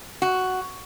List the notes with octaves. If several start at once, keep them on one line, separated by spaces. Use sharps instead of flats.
F#4